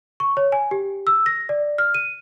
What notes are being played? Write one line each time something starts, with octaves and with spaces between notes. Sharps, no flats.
C#6
C#5
G#5
G4
E6
A#6
D5
F6
D#7